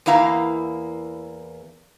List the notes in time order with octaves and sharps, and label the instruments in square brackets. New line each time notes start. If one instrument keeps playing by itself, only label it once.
[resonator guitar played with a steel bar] E2 A#3 E4 F5 A#5